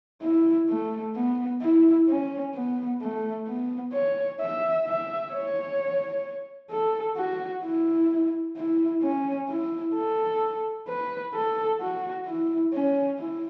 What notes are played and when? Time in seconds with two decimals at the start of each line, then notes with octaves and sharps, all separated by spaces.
0.22 E4
0.69 A3
1.16 B3
1.61 E4
2.08 C#4
2.55 B3
3.01 A3
3.47 B3
3.93 C#5
4.40 E5
4.86 E5
5.32 C#5
6.71 A4
7.17 F#4
7.64 E4
8.57 E4
9.03 C#4
9.50 E4
9.95 A4
10.88 B4
11.35 A4
11.81 F#4
12.26 E4
12.74 C#4
13.19 E4